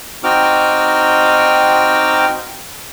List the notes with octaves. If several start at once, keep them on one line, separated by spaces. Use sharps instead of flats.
C4 D#4 F#4 G5 D6 F6